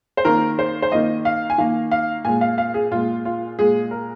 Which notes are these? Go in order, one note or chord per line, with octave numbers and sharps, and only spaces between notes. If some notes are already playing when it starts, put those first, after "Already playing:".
C5
D#3 A#3 A#4
C5
C5
D#3 A#3 D#5
F5
G#5
D#3 A#3 F5
F5
A#2 G#3 G#5
F5
F5
G#4
A#2 G#3 F4
F4
A#2 G#3 G#4
A#4